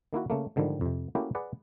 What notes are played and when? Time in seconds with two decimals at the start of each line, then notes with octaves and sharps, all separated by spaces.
0.13 D#3 A#3 E4 F#4
0.30 C#3 A3 A#3
0.56 G#2 D3 D#3 F3 G3
0.81 F2 C3
1.15 A3 A#3 C#4 E4 F#4 G4
1.35 G#4 B4 D5 F#5